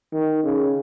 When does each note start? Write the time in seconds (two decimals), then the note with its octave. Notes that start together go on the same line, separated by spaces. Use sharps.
0.13 D#3
0.43 C#3